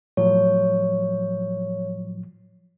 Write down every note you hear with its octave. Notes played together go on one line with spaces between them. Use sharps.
A2 F3 F#3 C#5